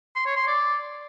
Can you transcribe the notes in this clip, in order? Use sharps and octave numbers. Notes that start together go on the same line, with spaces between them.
C6
C#5
C6
D5